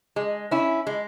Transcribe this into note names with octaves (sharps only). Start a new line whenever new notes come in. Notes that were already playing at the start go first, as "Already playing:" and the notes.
G#3
C#4 E4
G#3